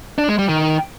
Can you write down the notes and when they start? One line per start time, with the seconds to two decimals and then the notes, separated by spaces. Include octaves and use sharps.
0.18 D4
0.29 G#3
0.39 G3
0.49 D#3